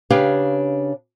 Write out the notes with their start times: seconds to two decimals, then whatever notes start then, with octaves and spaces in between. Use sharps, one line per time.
0.10 C#3 D4 G4 B4 C#5 F5